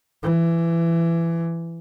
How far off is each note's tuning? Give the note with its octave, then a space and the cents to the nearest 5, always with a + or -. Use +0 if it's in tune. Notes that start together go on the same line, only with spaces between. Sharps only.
E3 +20